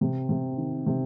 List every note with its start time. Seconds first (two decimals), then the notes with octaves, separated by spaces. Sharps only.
0.01 C3
0.29 C3
0.57 D#3
0.86 C3